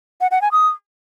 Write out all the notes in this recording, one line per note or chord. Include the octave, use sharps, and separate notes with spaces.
F#5
F#5
G#5
D#6